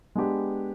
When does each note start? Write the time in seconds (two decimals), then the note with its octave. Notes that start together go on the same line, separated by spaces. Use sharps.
0.15 G#3 B3 D4 G4